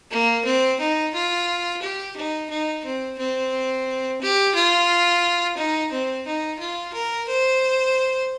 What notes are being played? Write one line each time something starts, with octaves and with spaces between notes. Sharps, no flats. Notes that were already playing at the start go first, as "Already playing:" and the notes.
A#3
C4
D#4
F4
G4
D#4
D#4
C4
C4
G4
F4
D#4
C4
D#4
F4
A#4
C5